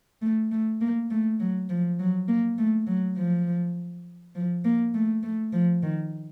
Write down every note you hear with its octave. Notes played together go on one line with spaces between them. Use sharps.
A3
A3
A#3
A3
F#3
F3
F#3
A#3
A3
F#3
F3
F3
A#3
A3
A3
F3
D#3